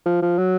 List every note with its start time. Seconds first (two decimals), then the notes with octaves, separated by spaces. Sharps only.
0.06 F3
0.22 F3
0.38 F#3